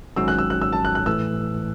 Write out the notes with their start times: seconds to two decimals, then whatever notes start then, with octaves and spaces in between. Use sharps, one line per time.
0.16 G#1 G#2 F#3 C#4 F#4 E6
0.28 F#6
0.38 E6
0.50 F#6
0.62 E6
0.73 A5
0.85 F#6
0.95 F#6
1.06 A2 E3 A3 E6